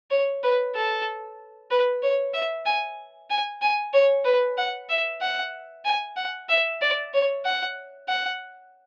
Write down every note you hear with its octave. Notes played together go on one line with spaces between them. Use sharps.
C#5
B4
A4
B4
C#5
E5
G#5
G#5
G#5
C#5
B4
F#5
E5
F#5
G#5
F#5
E5
D5
C#5
F#5
F#5